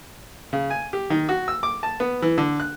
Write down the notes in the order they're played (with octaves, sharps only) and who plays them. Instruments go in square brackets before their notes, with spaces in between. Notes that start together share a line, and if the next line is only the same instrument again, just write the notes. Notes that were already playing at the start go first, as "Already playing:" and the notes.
[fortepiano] C#3
G#5
G4
D#3
F#4
E6
D6
A5
B3
E3
D3
F#6